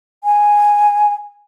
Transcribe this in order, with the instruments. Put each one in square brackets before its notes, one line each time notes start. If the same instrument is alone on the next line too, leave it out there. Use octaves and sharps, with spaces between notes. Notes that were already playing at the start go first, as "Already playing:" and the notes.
[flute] G#5